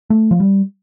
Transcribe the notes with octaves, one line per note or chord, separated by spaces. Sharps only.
A3
F3
G3